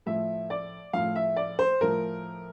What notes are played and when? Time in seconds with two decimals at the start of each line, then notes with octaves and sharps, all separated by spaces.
0.06 A2 F3 E5
0.50 D5
0.93 A2 F3 F5
1.16 E5
1.36 D5
1.59 C5
1.81 A2 F3 A#4